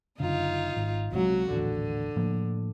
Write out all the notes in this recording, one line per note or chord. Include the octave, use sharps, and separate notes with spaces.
F#1 D3 D#4 F4
G#1
C2 C3 F#3 G#3 F#4
D#1 A1 D3
A2 F3 A#3